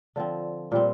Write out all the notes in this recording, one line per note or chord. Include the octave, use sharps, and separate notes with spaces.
D3 F3 C4
A#2 G3 C4